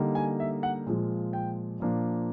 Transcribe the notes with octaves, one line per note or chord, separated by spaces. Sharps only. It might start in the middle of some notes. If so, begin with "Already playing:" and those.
Already playing: D3 G3 A#3 D#4
G#5
E5
F#5
A#2 F3 G#3
G5
A#2 F3 A#3 D4